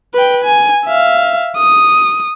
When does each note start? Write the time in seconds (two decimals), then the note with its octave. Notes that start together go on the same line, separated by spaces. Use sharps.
0.14 B4 G5
0.44 G#5
0.86 E5 F5
1.57 D#6